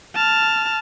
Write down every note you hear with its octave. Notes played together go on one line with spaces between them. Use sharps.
A5 F6